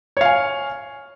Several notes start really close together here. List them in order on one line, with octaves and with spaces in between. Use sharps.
C#5 F5 G#5